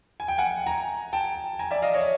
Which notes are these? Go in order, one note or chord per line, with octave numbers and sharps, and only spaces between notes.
G#5
G5
F#5 G#5
G#5 A#5
G5 A5
G#5 A#5
D5 E5
D#5 F5
C#5 D#5